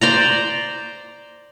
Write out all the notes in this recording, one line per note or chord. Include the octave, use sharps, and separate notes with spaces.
C5 D5 A#5